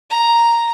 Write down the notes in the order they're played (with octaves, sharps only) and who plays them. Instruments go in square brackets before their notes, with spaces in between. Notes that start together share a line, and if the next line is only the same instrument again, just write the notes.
[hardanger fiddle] A#5